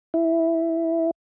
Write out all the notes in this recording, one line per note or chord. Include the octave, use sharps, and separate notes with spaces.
E4